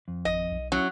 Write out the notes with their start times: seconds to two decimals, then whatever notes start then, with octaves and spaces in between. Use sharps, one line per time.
0.08 F2
0.25 G#1 D#5
0.51 B1
0.72 F#3 C#4 E4